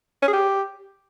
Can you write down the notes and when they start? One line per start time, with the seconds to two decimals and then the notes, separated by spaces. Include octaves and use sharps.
0.22 C#4
0.28 G#4
0.33 G4